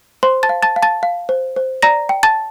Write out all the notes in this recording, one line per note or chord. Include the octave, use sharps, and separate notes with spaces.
C5 C6
A5 A6
F5
A5 A6
F5
A5 A6
F5
C5
C5
D5 A#5 A#6
G5
A5 A6